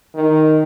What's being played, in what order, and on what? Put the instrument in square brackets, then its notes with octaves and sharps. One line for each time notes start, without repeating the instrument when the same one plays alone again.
[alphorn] D#3